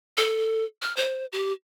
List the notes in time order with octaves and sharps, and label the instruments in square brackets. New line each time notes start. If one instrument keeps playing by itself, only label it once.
[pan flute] A4
F6
C5
G4